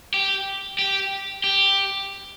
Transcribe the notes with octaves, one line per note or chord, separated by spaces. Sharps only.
G4
G4
G4